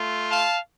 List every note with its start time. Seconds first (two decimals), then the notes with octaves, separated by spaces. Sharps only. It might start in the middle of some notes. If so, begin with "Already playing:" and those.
Already playing: A3 F4
0.30 F5 A5